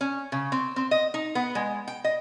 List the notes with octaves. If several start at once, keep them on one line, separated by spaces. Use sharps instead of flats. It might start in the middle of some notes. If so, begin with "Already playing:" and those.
C#4
C#3
C4
C4
D#5
D#4
B3
G#3
G5
D#5